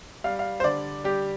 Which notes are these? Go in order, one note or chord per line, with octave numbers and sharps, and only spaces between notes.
G3 F5
F5
C5
D3 D5
G3 G4